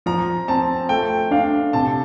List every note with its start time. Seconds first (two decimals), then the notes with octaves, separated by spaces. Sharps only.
0.06 F3 A#5
0.48 C4 A5
0.89 A3 G5
1.31 D4 F5
1.73 C3 A5